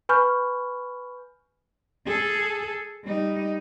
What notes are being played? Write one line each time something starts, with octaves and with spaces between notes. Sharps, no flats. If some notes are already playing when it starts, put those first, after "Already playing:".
B4 G#5 B5 C#6 F6 G6
G#4 A4
G3 D#4